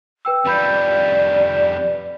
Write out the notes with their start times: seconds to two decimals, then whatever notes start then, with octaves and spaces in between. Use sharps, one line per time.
0.25 B4 G5 E6
0.45 F2 G3 B4 D5 B5 G6